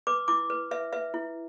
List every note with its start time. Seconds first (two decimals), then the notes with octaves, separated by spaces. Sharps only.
0.07 B4 D6
0.28 E4 D6
0.50 B4
0.71 B4 E5
0.93 B4 E5
1.14 E4